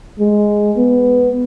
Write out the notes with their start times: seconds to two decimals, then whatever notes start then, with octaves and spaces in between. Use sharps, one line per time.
0.19 G#3
0.77 B3